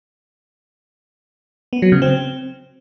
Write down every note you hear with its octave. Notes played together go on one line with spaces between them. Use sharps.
B3
F#3
C#3
C4